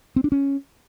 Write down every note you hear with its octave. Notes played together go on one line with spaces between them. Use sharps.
C4
D4
C#4